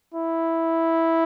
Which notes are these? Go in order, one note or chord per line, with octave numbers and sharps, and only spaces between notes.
E4